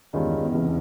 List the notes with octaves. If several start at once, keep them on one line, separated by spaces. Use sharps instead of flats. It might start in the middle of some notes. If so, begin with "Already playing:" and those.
E2 G2 D#3 G#3 C#4 F4
C#2 C3 E3